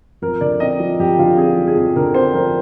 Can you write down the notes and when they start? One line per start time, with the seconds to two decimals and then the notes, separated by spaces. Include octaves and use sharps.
0.22 F2 A#4
0.41 D3 D5
0.60 C4 D#5
0.80 F3
0.99 F2 G4
1.19 D3 F4
1.37 C4 G#4
1.58 F3
1.67 G#4
1.76 F2
1.96 D3 A#4
2.14 C4 C5
2.34 F3 A#4